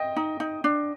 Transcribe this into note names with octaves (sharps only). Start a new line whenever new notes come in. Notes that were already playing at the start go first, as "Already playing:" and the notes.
Already playing: D#5 G5
D#4
D#4
D4